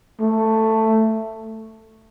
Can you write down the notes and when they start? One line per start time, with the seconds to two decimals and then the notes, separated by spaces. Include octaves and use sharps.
0.21 A3